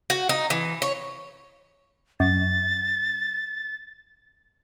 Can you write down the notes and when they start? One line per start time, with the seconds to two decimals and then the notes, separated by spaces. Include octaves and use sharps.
0.10 F#4
0.29 D#4
0.50 E3
0.82 C#5
2.20 F#2 A6